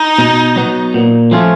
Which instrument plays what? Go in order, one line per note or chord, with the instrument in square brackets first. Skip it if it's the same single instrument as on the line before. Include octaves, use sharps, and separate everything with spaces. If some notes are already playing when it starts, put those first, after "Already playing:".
Already playing: [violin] D#4
[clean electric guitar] B2
F#3 B3
A#2
F3 A3 C#4 F4